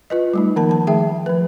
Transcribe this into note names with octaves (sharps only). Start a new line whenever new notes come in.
F4 B4 D#5
G3 A3 D#4
D#3 F3 A#3 A#4 A5
F3 A5
D#3 A3 G#4 E5 G5
F3 B4